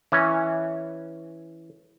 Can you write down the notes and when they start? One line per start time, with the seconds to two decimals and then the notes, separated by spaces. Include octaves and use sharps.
0.12 E3 C#4